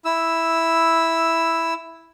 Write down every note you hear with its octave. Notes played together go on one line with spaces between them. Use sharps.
E4 E6